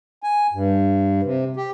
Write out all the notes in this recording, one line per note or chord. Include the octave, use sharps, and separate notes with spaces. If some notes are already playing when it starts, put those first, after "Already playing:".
G#5
G2
C3
G4